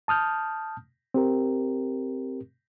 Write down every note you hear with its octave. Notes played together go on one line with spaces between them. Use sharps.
A5 D#6 F6 G6
C4 G4 A#4